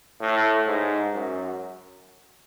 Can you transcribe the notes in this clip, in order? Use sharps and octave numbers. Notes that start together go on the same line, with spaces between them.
A2
G#2
F#2